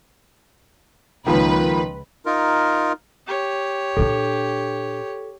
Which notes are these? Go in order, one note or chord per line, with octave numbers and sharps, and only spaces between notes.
C#2 D#3 F3 A#3 B4 B5
D#4 F4 A#4
G4 C#5
A#2 D4 A4